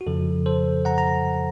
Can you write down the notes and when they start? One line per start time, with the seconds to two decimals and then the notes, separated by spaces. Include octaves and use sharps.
0.01 F#4
0.07 F2 C#3 F3 A4
0.46 A4 C5
0.85 F#5 A#5
0.98 A#5